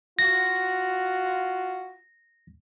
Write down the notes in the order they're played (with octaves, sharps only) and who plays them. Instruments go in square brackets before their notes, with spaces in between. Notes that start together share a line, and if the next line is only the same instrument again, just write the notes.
[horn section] F4 F#4 [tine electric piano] A#6